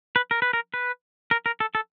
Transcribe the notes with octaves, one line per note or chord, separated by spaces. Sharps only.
B4
A#4
B4
A#4
B4
A#4
A#4
A4
A4